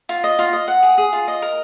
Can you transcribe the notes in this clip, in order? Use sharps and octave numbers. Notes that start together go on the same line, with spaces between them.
F4
D#5
F4
D#5
F#5
G#4
G#4
F4
D#5
A#4